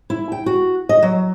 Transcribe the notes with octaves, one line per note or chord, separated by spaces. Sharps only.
E4
G5
F#4
D#5
F#3